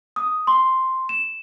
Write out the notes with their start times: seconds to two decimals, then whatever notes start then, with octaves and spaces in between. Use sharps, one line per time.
0.16 D#6
0.47 C6
1.09 E7